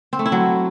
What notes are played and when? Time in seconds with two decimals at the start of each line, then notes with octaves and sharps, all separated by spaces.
0.13 C4
0.19 A3
0.26 E4
0.32 F#3